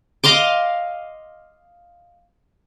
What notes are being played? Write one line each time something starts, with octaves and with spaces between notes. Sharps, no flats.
D#5 F5 C6 D6